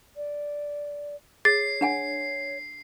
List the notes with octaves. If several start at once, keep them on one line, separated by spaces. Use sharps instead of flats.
D5
G#4 C#5 A6 C7
D4 F#5 G#5